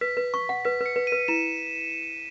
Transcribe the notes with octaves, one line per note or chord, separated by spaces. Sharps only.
B4 B6
B4
C#6
F#5
B4 B6
B4
C#7
B4
B4 D#7
E4 E7